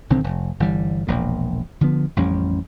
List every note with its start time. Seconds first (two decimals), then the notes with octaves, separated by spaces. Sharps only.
0.10 B1 D3 D#3 C4
0.24 F1
0.60 G1 E3 G3
1.07 E1 A#1 A#2
1.81 D3 F3 B3
2.16 A1 F2 G3 C#4